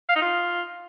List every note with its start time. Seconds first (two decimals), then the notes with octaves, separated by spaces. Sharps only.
0.09 F5
0.15 D#4
0.22 F4